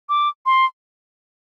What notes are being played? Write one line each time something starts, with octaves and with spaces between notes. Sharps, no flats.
D6
C6